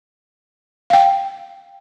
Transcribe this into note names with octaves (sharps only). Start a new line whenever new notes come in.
F5 G5